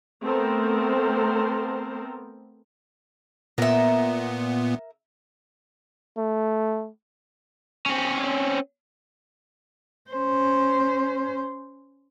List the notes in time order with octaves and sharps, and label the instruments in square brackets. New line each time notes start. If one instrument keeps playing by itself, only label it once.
[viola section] A3 B3 C4 A4 A#4 C5
[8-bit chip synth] A#2 B3 [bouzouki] A#4 E5
[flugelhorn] A3
[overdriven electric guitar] C4 C#4
[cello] C#4 C5